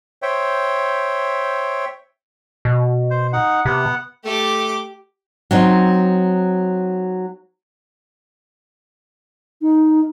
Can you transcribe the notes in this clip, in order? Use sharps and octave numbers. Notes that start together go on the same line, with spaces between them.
C5 C#5 E5 G5
B2
C5
D#4 F#5
C3 B3 F#5
A3 G4 D6
F#3 C4 D#4
D#4